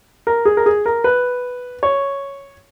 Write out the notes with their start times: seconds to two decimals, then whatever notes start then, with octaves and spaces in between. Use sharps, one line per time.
0.27 A#4
0.45 G#4
0.57 A#4
0.66 G#4
0.86 A#4
1.04 B4
1.83 C#5